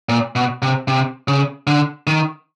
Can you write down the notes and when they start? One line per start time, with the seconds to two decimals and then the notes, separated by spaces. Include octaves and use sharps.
0.09 A#2
0.36 B2
0.62 C3
0.88 C3
1.28 C#3
1.67 D3
2.07 D#3